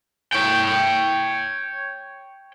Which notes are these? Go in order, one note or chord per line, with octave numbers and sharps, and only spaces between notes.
C#5 G5